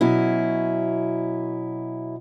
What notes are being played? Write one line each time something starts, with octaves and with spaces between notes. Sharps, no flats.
B2 F#3 C#4 E4